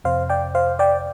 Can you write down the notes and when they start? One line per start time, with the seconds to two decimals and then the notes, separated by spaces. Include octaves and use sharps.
0.04 F2 C3 C5 F5
0.30 D5 G5
0.55 C5 F5
0.79 D5 G5